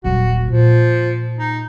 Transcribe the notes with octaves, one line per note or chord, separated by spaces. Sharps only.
D#1 F#3 F#4
A#2 F3
D#4